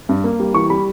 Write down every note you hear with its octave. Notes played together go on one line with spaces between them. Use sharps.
G2
A#3
G3
E3 C#6
G3 B5